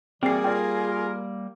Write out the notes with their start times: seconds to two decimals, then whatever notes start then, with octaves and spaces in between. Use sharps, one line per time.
0.23 E3 G3 A#3 C4 F#4 G#4 D5 C7
0.44 F4 A#4 D5 G5